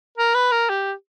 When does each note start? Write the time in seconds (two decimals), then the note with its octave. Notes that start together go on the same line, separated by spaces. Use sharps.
0.18 A#4
0.34 B4
0.51 A#4
0.70 G4